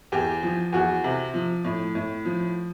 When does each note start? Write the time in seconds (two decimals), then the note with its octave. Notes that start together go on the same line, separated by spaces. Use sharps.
0.12 E2 G4
0.43 F3
0.73 E2 F#4
1.04 C3
1.34 F3
1.64 A2
1.95 A2
2.25 F3